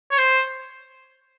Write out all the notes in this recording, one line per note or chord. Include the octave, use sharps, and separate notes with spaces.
C#5
C5